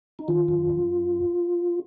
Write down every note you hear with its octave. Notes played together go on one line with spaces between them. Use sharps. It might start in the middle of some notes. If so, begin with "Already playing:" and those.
D#4
D#3 F4
F#2
F#2